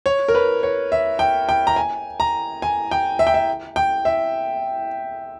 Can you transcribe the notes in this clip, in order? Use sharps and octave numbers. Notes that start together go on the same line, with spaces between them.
C#5
A#4
B4
C#5
E5
G5
G5
A#5
G#5
A#5
G#5
G5
E5
G5
E5
G5
E5